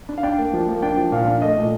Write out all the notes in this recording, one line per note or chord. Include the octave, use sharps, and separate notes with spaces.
D4
F5
D4 G5
A#3
F3
A#3
D4 G5
F3
A#2 F5
D4
A3 D#5
A#2